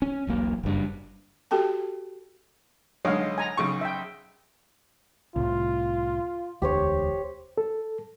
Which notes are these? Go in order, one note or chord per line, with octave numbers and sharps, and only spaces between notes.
C#4
E1 B1 A#3
F#1 G2
F#4 G4 A4 G5 A5
B1 D3 G#3 C#5 F5
G#5 A#5
B1 C#3 C#6
E5 G5
C2 A2 F4
E1 D2 G4 C5 C#5
A4